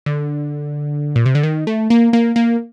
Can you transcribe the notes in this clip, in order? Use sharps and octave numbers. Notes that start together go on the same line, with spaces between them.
D3
A#2
C3
D3
D#3
A3
A#3
A#3
A#3